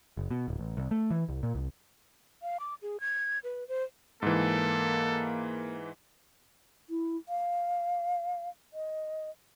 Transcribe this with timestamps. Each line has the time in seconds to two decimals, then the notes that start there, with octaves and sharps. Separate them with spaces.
0.17 F#1
0.30 B2
0.48 D1
0.59 A1
0.77 C2
0.91 A3
1.11 E3
1.29 C2
1.43 A#2
1.55 C2
2.42 F5
2.60 D6
2.82 G#4
3.00 G#6
3.44 B4
3.68 C5
4.22 G#2 E3 A#3 A4
6.90 E4
7.29 F5
8.74 D#5